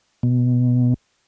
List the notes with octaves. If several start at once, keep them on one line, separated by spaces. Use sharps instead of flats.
B2